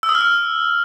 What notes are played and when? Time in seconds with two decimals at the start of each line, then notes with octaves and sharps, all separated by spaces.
0.03 E6
0.09 D#6
0.15 F6
0.21 E6